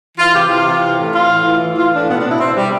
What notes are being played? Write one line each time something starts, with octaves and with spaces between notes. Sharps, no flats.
E3 F4
C3 G4
E3 F4
C3
E3
A2
E3 F4
A2
E3
A2
E3 F4
A2 D4
B2 B3
D4
B2
E4
B2 C4
B2 G3